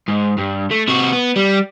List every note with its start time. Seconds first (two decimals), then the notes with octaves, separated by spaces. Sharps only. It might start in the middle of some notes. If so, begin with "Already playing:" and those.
0.08 G#2
0.38 G2
0.71 A3
0.88 C3 F#4
1.13 B3
1.36 G3